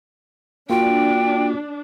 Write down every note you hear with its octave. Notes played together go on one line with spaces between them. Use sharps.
A#3 D4 F4 F#4 G5